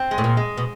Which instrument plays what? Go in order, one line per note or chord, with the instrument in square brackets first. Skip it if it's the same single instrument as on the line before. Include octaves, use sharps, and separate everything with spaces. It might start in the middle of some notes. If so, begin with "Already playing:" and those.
Already playing: [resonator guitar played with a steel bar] C4
G#3
[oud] A2
A#2
[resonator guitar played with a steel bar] G#3
[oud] B2